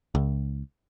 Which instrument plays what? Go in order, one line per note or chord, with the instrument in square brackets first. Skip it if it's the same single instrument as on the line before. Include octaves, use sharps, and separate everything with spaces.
[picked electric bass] C#2